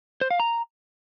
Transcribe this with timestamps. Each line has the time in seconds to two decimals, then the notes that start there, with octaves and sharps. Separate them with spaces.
0.21 C5
0.31 F5
0.40 A#5